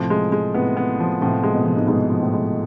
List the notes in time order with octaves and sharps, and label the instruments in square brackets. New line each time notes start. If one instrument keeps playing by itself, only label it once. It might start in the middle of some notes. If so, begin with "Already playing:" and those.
Already playing: [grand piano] A2 C3 [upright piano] F3
[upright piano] G#3
G#3
[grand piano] A2 C3 [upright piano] B3
[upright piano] B3
F3
[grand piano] A2 C3 [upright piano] F3
[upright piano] G#3
[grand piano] B2
[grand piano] C3 [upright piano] F3
[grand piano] G#2 B2
[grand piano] G#2 B2 [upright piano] G#3
[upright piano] F3
[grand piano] A2
[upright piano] G#3